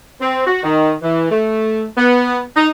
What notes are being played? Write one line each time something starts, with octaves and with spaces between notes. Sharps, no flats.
C4
F#4
D#3
E3
A3
B3
D#4